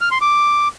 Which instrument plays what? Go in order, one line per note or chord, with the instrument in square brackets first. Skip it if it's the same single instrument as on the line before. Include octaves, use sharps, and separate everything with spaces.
[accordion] F6
C6
D6